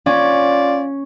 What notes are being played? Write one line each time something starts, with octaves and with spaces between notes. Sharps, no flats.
C#4 F4 D5